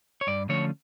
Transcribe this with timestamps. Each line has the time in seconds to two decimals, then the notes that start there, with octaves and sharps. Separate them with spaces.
0.21 C#5
0.27 G2 D5
0.49 D3 F3 A3 C#4 C#5